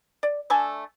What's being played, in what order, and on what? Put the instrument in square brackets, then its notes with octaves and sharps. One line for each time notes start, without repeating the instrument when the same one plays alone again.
[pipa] D5
A3 D4 A4 G#5